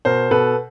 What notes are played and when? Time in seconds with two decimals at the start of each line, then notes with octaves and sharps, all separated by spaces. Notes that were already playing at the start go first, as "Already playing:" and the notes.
0.05 B2 A#4 C5
0.31 B2 A4 B4